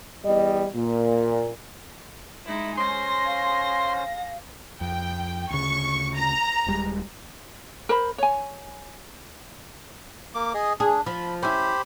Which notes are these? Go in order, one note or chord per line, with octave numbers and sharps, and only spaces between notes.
E2 G3 D#5
A#2
G#3 D#4 E4
C#4 G#4 C5 C6 A#6
F5
F2 G5
D2 C#3 C#6
A#5
D#1 G3 G#3
A#4 C5 B5
C#5 G#5
A#3 D6
G#4 D#5
D4 G#4
F3 B5
C#4 E4 G4 C5 B5